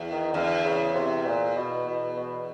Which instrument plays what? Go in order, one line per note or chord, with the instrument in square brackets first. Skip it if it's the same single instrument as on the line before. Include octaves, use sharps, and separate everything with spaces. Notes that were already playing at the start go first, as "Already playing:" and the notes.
Already playing: [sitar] E2
[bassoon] D#3
[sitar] E2 [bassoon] D3
[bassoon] C#3
C3
A#2
B2
B2
B2